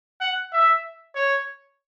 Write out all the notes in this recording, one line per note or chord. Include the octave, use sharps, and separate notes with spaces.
F#5
E5
C#5